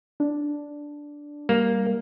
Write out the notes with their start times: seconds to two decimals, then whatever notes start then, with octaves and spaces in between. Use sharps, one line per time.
0.20 D4
1.49 G3 A#3